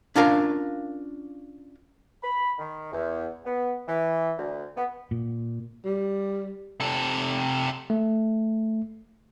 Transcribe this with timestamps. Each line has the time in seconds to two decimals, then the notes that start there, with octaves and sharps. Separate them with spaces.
0.16 C#4 D4 F4 A#4 F5
2.22 B5
2.58 D#3
2.92 E2
3.45 B3
3.88 E3
4.37 D2
4.76 B3
5.11 A#2
5.84 G3
6.80 C3 A4
7.90 A3